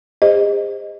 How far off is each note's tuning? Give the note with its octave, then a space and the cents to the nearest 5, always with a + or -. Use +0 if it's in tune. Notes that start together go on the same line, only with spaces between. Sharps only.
G#4 -45 C5 +0 D#5 +0